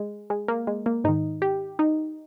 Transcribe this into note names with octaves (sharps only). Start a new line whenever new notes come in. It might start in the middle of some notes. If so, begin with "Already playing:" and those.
Already playing: G#3
G#3
A#3
G#3
A#3
G#2 D#3 D#4
G4
D#4